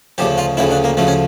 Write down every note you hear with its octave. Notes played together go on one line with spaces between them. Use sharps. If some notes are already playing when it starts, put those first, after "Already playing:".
D2 C#3 F3 G4
F4
D2 C#3 F3 E4
D4
A#3
D2 C#3 F3 A3
C#4